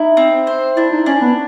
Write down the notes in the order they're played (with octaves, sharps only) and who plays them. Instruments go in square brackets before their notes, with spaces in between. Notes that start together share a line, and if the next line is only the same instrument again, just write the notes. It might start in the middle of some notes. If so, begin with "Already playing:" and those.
Already playing: [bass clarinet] D#4 [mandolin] E4
[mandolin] C4
C5
[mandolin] D4 [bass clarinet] E4
[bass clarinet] D#4
[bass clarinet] C#4 [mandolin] D4
[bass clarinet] B3